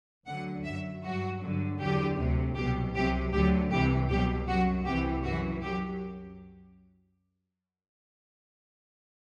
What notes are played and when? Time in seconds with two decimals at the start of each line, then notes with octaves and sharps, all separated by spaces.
0.26 D2 D3 F#3 F#5
0.64 F#2 F#3 E5
1.03 G2 F#3 F#4
1.42 G2 D3 F#3
1.79 E2 D3 F#3 G4
2.18 D2 C3 F#3
2.56 C2 B2 F#3 G4
2.94 C2 C3 F#3 G4
3.33 D2 D3 F#3 G4
3.71 C2 C3 E3 G4
4.09 C2 B2 F#3 G4
4.48 F#2 F#3 F#4
4.85 C2 C3 E3 G4
5.24 F#2 E3 F#4
5.62 F#2 F#3 G4